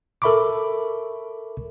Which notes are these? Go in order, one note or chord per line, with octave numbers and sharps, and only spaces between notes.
A4 A#4 E5 B5 C#6 D6